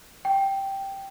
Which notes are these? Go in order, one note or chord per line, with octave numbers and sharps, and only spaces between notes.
G5